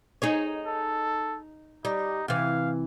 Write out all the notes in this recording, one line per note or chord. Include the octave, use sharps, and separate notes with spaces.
D#4 G#4 C#5
A4
G3 D#4
C3 E3 F5